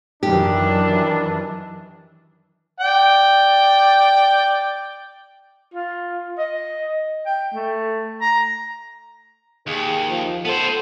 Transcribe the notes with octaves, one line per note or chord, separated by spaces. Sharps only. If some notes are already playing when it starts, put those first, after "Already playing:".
F#2 D#3 E3 D4 G4
D5 G5
F4
D#5
G5
A3
A#5
D#2 G#4
F3
B3 A4 C5